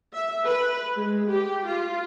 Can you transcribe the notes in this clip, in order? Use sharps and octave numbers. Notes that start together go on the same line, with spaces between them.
E5
B4
G#3
G4
F4